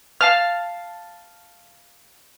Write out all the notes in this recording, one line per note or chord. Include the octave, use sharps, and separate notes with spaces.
F5 A5 F6